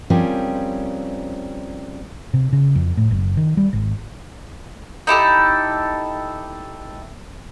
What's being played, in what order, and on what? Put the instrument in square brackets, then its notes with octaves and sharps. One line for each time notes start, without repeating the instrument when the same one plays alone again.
[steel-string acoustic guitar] F3 G3 C4 C#4 G#4 A#4
[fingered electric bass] C3
C#3
F2
A2
F#1
D#3
G3
G#1
[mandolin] D#4 E4 G4 A4